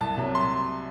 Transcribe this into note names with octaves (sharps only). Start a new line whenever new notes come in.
C2 A5
C3 F#3
C6